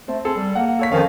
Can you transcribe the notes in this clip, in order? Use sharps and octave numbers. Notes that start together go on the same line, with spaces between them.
A3 C4
C4 G#4 A4
G3
A#3 F#5
A4 C#5 B6
F2 D#3 F3 C#4 F5